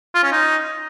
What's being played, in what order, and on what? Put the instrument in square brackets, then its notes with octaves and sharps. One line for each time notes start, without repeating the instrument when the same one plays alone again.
[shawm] F4
C#4
D#4